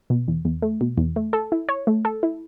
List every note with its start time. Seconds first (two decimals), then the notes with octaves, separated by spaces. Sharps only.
0.10 B2
0.28 E2
0.45 E2
0.62 A3
0.81 B2
0.98 E2
1.16 A3
1.33 A4
1.52 E4
1.69 C#5
1.87 A3
2.05 A4
2.23 E4